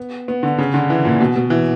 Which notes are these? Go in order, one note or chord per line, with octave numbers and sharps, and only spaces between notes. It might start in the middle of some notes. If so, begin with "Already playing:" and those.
Already playing: B3
B3
D3
C#3
D3
E3
A#2
B2
B2
E3